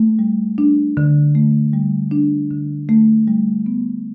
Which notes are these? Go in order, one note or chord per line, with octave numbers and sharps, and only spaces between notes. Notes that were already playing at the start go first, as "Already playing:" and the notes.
Already playing: A3
G3
D4
D3
A3
G3
D4
D3
A3
G3
B3